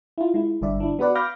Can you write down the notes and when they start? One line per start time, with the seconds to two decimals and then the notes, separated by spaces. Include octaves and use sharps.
0.18 E4 F4
0.34 G#3 E4
0.61 G1 G2 D3 D5 E5
0.80 D4 E4
0.99 B3 F#4 B4 D5 F#5
1.15 F5 B5 D6 F6 G6 A#6